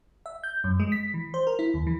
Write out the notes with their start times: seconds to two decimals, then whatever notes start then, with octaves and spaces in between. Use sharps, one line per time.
0.26 E5
0.44 G6
0.64 F#2
0.80 G#3
0.92 B6
1.14 E3
1.34 C5
1.47 A#4
1.59 E4
1.74 D#2
1.87 E3